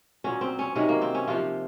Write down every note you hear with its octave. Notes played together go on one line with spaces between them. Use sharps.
A#2 F#3 C#4
C4
C#4
C3 D#3 F#3 C#4
A#3
C4
C#4
C3 F3 F4